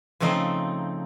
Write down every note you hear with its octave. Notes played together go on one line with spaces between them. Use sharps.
C#3 F3 A3 C4 D#4